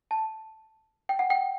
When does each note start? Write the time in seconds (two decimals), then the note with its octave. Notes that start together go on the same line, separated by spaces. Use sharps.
0.11 A5
1.09 G5
1.19 F#5
1.30 G5